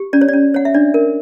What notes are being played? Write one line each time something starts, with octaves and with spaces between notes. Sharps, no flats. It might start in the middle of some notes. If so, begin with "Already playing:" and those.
Already playing: G4
C#4 D5
C#5
D5
C#4
C#5 F#5
E5
D4 D5
A#4